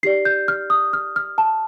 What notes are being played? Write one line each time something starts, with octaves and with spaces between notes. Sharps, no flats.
D#4 G4 D5 C7
G6
F6
D#6
F6
F6
A5